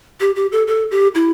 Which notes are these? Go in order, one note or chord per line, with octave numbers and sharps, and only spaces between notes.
G4
G4
A4
A4
G4
E4